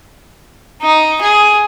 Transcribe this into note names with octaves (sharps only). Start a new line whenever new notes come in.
D#4
G#4